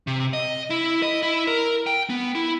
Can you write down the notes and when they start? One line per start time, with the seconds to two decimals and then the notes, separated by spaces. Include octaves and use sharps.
0.07 C3
0.33 D#5
0.70 E4
1.02 D#5
1.22 E4
1.47 A#4
1.86 G5
2.10 B3
2.35 E4